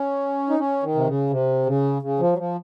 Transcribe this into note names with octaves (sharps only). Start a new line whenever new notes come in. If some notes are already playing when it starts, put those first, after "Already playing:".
Already playing: C#4
D#4
C#4
D#3
C3
C#3
C3
C#3
C#3
F3
F#3
F3